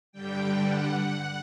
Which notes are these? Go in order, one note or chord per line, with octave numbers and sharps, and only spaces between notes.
G2 D3 G3 G5
F#5